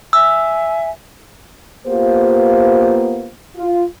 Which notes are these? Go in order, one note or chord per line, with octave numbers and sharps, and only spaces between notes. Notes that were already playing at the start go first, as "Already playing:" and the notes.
E5 G#5 E6
A#3 B3 F4 G4 C5
F4